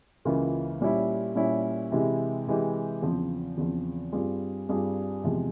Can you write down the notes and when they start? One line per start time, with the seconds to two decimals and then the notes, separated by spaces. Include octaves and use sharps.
0.25 C#2 C#3 E3 A#3 F4
0.81 A#2 G3 C#4 E4
1.35 A#2 G3 C#4 E4
1.92 C3 E3 G#3 E4 G4
2.47 C3 E3 G#3 E4 G4
3.02 E2 C#3 F3 C4
3.57 E2 C#3 F3 C4
4.13 G2 G3 C4 F4 G#4
4.69 G2 G3 C4 F4 G#4
5.24 E2 C3 F3 G#3